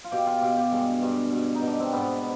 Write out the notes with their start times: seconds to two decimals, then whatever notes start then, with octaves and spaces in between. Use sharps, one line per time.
0.04 F4
0.12 B2 G4
0.27 F4
0.41 B2 G4
0.57 G4
0.72 G2 G#3
1.02 G2
1.32 B2
1.55 D#4
1.62 B2 D4
1.80 C4
1.92 G#2 B3